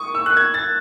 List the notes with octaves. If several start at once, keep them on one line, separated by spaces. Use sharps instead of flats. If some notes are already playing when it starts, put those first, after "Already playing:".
Already playing: C#6 D#6
E6
F#6
G#6
A6